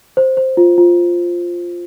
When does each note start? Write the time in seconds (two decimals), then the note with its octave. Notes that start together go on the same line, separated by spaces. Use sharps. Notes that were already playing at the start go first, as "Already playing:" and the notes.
0.17 C5
0.37 C5
0.57 F4
0.78 F4